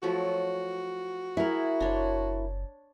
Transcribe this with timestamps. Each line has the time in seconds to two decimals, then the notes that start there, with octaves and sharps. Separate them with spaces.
0.03 F3 F#3 A3 F#4
1.37 E4 G#4 A#4
1.80 F#1 D4 C#5 C6